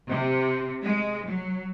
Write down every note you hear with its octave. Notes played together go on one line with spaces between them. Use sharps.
C3
G#3
F#3